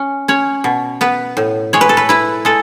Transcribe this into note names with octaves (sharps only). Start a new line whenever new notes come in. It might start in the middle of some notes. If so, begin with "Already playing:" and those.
Already playing: C#4
C#4 C#5
B2
B3 B4
A2
G#3 C#5
B4
A4
B4
E4 B4
G#3 A4